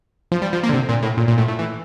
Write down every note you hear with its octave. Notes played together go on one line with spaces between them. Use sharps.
F3
G3
F3
A#3
D3
C3
A#2
A2
A#2
A#2
A2
A2
E3